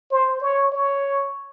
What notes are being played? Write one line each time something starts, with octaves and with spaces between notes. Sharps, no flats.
C5
C#5
C#5